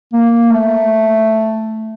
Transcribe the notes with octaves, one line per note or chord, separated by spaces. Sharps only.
A#3
A3